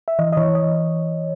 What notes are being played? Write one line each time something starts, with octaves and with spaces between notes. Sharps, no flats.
E5
E3 D#5
D#5
E3 C#5
D#5